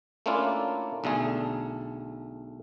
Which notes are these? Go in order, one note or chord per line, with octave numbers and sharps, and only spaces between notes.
A3 A#3 C#4 D4 E4 F4
B1 D3 A3 G#4